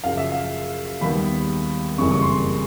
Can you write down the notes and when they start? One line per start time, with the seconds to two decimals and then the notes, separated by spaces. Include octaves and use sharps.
0.04 F#2 C#3 F3 F5
0.17 E5
0.32 F5
1.01 D#2 D#3 G3 B3 B5
1.98 F#1 F2 C#3 E3 G3 C#6
2.11 C#6
2.22 C6